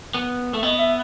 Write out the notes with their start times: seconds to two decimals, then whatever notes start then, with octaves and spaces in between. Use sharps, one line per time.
0.14 B3
0.54 A3 E5
0.63 B3 D#5
0.79 E5